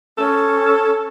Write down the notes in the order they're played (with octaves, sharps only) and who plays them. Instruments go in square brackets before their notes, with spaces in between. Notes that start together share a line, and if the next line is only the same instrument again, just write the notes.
[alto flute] C#4 [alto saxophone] A4